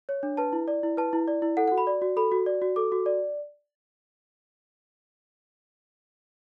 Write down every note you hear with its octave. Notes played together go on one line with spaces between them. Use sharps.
C#5
D4
B4 A5
E4
D5
E4
B4 A5
E4
D5
E4
A4 F#5
F#5
F#4
B5
D5
F#4
A4 B5
F#4
D5
F#4
A4 D6
F#4
D5